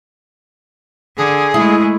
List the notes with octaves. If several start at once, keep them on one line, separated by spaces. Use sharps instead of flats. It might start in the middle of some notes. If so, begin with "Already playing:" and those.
D3 G#4
G#3 A3 E4